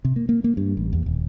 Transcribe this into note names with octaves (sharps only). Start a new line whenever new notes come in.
C3
A#3
A#3
A#3
G2
A1
E2
D#1